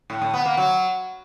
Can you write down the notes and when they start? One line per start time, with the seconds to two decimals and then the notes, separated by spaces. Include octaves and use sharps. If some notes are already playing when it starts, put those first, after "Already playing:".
0.10 A2
0.22 A2
0.34 B3
0.45 A#3
0.57 F#3